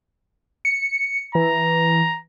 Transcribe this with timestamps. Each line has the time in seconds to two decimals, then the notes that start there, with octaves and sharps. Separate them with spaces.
0.65 C#7
1.35 E3 A#5